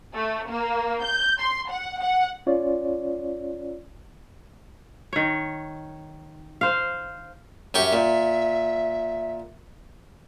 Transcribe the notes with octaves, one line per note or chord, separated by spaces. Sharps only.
A3
A#3
G6
C6
F#5
F#5
C#4 F4 C#5 D5
D#3 C#5
C5 F5
F#2 G4 E5 C#6
A#2